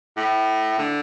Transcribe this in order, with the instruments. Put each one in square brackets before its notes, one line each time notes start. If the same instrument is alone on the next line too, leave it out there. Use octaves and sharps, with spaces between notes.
[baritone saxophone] A2
D3